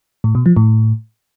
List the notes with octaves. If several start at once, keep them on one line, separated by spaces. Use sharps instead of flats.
A2
B2
F3
A2